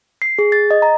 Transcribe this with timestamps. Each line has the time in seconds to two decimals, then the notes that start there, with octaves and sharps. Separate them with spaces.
0.22 C7
0.39 G#4
0.52 A6
0.71 D#5
0.82 A#5